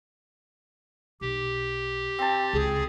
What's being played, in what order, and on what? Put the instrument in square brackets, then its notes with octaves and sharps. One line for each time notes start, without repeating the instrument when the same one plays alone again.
[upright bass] B1 [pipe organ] G4
[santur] C4 A5
[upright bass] C#2 [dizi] G#4